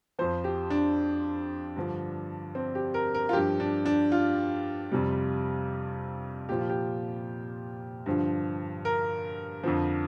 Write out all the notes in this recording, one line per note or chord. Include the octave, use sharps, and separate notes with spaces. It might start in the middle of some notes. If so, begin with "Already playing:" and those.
F2 F3 C5
G4
D4
G2 D3 F3
C4
G4
A#4
A#4
F4
G2 F3 G4
D4
D4
F4
F2 C3 G3
A#2 F3 G4
F4
G4
G2 D3 F3
A#4
F2 D3 F3